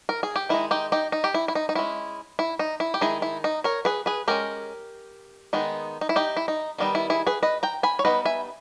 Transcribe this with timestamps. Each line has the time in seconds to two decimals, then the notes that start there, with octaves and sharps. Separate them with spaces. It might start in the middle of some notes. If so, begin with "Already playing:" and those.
0.09 A#4
0.23 G#4
0.36 G4
0.49 D#3 G#3 D#4 E4
0.71 D#4 G4
0.92 D#4 G4
1.12 D#4
1.24 G4
1.34 E4
1.48 E4
1.55 D#4
1.69 D#4
1.75 G#3 C#4 E4
2.39 E4
2.59 D#4
2.80 E4
2.94 G4
3.01 D#3 G#3 D#4 E4 G#4
3.22 E4
3.44 D#4
3.64 A#4 C#5
3.85 G#4 B4
4.06 G#4 B4
4.28 G#3 C#4 G4 A#4
5.53 D#3 G#3 B3 D#4
6.01 D#4
6.09 E4
6.16 D#4 G4
6.37 E4
6.48 D#4
6.78 D#3 G3 B3 D#4
6.95 E4
7.10 E4 G#4
7.27 G#4 B4
7.43 B4 D#5
7.63 G5 A#5
7.83 G#5 B5
7.99 C#5
8.05 G3 B3 D#4 B4 D#5
8.25 E5 G#5